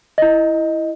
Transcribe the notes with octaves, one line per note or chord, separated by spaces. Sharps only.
E4 D#5